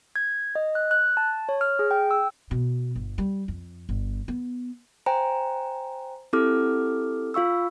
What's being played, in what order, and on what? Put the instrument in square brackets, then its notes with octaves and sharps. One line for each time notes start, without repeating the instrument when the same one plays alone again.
[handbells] G#6
D#5
F#6
F#6
A5
C#5
F6
G#4
G5
E6
[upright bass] B2
G1
G3
F2
G1
B3
[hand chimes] C5 G5 G#5 A#5
C4 E4 G4 A4 D6 F6
F4 F5 C#6 E6